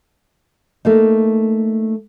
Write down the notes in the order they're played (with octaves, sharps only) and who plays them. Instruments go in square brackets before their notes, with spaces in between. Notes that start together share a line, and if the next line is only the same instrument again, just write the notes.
[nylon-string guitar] A3 A#3 D#4